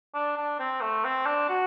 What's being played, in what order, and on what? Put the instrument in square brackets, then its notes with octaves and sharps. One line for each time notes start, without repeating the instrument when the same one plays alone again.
[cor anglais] D4
D4
C4
A3
C4
D4
F#4